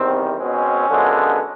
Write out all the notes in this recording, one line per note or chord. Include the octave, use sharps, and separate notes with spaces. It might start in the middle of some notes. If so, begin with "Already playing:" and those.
Already playing: E2 C3 D#3 G3 C4
B2 G#3 C4 C#4
F#2 D3 F3 G#3 B3